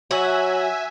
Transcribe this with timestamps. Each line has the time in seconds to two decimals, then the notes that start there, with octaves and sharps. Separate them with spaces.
0.11 F#3 F#4 E5 G#5